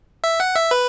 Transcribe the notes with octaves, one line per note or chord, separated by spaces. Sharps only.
E5
F#5
E5
B4